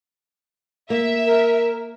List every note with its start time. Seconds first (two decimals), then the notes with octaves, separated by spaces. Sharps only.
0.90 A#3 E5
1.26 A#4